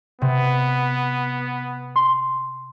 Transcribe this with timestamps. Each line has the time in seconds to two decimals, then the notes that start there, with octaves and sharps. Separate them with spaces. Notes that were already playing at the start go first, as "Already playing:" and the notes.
0.22 C3 B3
1.96 C6 C7